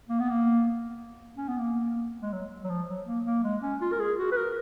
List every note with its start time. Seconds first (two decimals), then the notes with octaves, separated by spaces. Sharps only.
0.09 A#3
0.19 B3
0.29 A#3
1.37 C#4
1.48 B3
1.58 A#3
2.22 G#3
2.32 F#3
2.64 F#3
2.70 F3
2.88 F#3
3.06 A#3
3.25 A#3
3.44 G#3
3.62 C#4
3.81 F4
3.92 A#4
4.00 G#4
4.18 F#4
4.32 B4
4.37 A#4